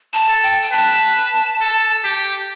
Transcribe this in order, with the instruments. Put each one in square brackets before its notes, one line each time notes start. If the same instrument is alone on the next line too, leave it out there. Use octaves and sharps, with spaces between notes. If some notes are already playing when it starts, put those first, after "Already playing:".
[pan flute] A5
[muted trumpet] A4
[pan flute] G5
G5
[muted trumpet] B4 [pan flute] A5
[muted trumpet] A4
G4